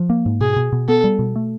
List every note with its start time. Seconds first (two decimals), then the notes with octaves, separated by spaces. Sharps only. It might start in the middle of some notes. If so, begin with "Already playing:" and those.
Already playing: F3
0.10 A#3
0.26 G#2
0.41 B2 G#4
0.56 B2
0.72 B2
0.88 B3 A4
1.04 G3
1.19 B2
1.36 A3